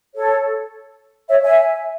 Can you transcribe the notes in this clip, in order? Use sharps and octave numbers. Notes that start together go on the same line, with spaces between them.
A4 C#5
C#5 E5
E5 G#5